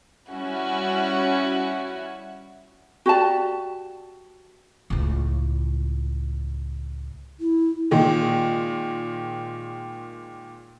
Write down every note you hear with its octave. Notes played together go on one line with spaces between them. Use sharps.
G3 C#4 E4 F#4
F#4 G4 D5 A5
C#2 A2
E4
A#2 D#3 G#3